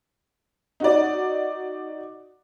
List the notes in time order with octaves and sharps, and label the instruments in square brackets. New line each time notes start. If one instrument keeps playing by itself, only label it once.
[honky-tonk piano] D#4 F#4 D5